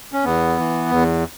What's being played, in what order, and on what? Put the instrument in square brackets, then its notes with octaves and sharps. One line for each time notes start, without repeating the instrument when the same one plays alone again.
[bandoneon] C#4
E2 B3
E3
E2